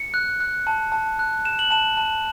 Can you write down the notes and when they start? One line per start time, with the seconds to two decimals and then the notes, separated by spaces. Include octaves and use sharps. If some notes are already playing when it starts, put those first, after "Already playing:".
Already playing: C#7
0.14 F#6
0.40 F#6
0.67 A5
0.92 A5
1.19 F#6
1.45 F#6 E7
1.59 F#7
1.71 A5 E7
1.97 A5